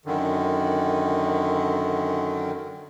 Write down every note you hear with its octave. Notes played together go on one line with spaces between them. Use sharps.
F#2 D3 D#3